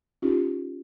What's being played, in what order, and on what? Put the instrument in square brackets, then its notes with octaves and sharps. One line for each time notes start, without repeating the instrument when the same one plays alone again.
[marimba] C#4 D#4 F4 G4